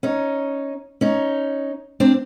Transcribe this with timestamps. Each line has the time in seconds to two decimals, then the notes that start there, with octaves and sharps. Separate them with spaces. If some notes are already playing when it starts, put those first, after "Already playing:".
0.03 C#4 D#4
1.01 C#4 D#4
2.00 C4 D4